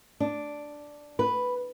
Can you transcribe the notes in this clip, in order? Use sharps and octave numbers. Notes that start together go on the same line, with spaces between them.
D4
B4